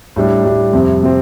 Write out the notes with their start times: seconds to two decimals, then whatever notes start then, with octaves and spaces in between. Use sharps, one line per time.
0.16 A2 G3 D4
0.45 A2 G3 D4
0.73 F2 C3 G3 C4
1.03 C3 G3 C4